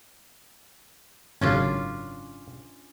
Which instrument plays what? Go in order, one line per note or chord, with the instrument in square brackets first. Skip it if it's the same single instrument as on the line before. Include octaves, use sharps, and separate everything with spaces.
[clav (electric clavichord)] G#1 F#2 C#3 [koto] C#4 D4 F4